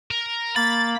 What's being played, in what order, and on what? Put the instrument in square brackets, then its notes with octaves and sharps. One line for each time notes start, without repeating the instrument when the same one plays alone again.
[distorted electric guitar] A#4
[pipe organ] A#3 [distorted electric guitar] B5 [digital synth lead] A6